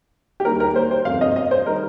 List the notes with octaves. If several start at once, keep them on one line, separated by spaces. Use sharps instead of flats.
G4
D#2 D#3 G3 A#4
A#4
C5
C5
G1 F2 C3 F5
D#5
D#5
C5
D#3 G3 A#4